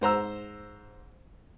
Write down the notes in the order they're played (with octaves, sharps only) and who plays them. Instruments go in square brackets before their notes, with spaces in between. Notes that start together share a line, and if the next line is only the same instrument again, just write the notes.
[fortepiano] G#2 C5 A#5 E6